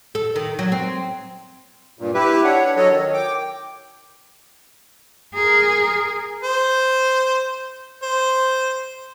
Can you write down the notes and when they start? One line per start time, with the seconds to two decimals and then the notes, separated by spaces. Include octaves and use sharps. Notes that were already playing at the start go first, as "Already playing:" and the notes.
0.15 A4
0.36 D#3
0.59 F#3
0.72 C4
1.99 G2 A#2
2.14 E4 G4 B4 E5
2.44 D4 C#5 F#5
2.77 F#3 A4 C#5 D#5
2.90 D#3
3.14 G5 D6
5.34 G#4 A#4
6.43 C5
8.02 C5